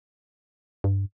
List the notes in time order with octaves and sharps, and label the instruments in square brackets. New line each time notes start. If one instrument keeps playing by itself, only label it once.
[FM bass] G2